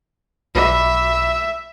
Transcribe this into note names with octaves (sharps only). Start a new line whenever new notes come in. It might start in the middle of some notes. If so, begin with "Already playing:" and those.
B1 E5 B5 D6